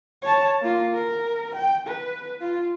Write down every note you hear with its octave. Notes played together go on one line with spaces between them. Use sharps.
C#5 A5
A#3 F4
A#4
G5
B4
F4